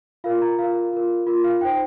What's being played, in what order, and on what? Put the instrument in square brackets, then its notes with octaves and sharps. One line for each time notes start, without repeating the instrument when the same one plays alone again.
[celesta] F4 A#4 F5
A#5
F4 A#4 F5
F4 A#4
F4 A#4
F5
D#4 C5 G5